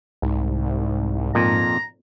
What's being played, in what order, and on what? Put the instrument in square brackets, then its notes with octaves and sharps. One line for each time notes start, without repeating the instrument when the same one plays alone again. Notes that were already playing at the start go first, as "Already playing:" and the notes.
[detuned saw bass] C2 [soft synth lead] G#2
[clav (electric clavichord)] F2 A#2 [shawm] A#5